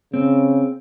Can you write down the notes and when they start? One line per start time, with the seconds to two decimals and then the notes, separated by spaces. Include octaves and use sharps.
0.14 C#3 C4